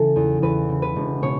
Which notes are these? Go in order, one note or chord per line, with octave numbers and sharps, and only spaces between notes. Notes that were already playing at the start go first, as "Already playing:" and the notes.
Already playing: C#3 E3 A4
E2
E2 B4
C#3
B4
E1
B2 C#5